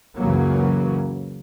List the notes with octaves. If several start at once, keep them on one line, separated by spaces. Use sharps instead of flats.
C#2 F#2 C#3 E3 F#3 A#3